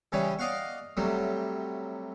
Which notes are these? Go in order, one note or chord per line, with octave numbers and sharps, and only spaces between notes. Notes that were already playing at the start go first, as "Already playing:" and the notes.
C#3 E3 G3 C#4 E5
D5 D#5 F5 F#5 C#6
C3 F#3 G3 A3